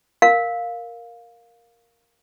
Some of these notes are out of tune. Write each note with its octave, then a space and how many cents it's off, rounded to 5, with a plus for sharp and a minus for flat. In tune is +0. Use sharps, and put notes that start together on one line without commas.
A#4 +0 F5 +10